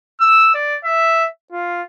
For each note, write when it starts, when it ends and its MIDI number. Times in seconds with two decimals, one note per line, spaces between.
0.20 0.52 88
0.54 0.76 74
0.84 1.26 76
1.52 1.82 65